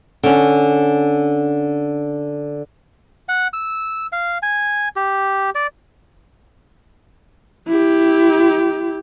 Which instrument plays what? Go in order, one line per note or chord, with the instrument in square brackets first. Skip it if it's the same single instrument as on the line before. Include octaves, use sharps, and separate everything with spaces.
[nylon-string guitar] D3 C#4
[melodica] F#5
E6
F5
G#5
G4
D5
[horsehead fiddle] E4 G4